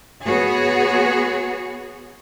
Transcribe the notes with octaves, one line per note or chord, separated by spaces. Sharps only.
B3 F#4 G#4 C#5